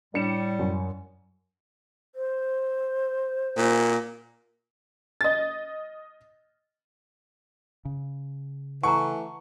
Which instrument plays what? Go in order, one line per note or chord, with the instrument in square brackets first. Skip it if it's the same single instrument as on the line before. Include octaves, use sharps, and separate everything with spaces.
[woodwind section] A2 G3 [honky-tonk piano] D4 C#7 E7
[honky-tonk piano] F#2
[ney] C5
[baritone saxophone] A#2
[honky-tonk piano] D#5 A6
[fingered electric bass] C#3
[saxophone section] E3 A3 [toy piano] F#5 A5 A#5 [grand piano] C#6